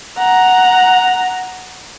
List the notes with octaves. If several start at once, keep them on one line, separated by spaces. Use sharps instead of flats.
F#5 A#5